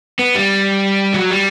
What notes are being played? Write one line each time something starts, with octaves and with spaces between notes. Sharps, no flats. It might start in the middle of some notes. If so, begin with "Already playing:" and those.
B3
G3
F#3
G3